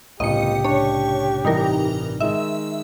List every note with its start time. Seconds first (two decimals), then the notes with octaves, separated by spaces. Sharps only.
0.20 G1 C2 A2 C#3 G4 D#5 C#7
0.64 D4 C#5
1.45 A1 G2 C3 E3 G3 D#4 A#4
2.20 D#3 G#3 D#5 E5